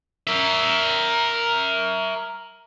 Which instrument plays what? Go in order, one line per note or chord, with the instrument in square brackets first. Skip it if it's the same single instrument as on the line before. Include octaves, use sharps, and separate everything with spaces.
[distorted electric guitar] A#4 E5